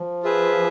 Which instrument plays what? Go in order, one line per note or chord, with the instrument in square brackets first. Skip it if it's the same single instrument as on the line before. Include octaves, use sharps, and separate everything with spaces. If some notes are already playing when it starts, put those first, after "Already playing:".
Already playing: [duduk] F3
[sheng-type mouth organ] F4 G#4 B4 E5